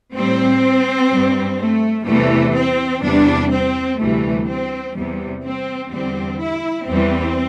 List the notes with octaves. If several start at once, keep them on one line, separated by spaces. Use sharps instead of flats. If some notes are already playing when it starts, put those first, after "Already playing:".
A2 G3 C4
G2 G3
A3
E2 C3 E3 G3 A3
C4
E2 C3 G3 D4
C4
D2 C3 E3 G3 A3
C4
E2 C3 G3
C4
E2 D3 G3 C4
E4
E2 E3 G3 C4